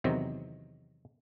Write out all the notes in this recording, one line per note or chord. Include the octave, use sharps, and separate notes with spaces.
E2 C3 D#3 F#3 C4